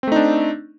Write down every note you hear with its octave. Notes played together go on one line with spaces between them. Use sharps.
A3 C4 D4 D#4